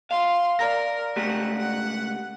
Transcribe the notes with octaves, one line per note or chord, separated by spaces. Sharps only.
F5 C6
A#4 D5 A#5 A#6
C#2 A3 G4 F#5
F#5